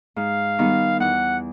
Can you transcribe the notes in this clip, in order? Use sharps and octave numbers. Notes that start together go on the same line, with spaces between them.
G#2 F5
D#3 G3 B3 D#4
E2 F#5